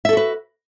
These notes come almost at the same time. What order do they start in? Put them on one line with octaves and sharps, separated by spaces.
E5 A4 F#4 B4